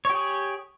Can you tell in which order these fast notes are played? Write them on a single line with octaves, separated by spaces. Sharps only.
C#5 G4 G#4